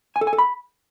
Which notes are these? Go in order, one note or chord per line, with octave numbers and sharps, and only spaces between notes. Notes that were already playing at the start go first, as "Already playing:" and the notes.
G#5
A4
G#5
A4
B5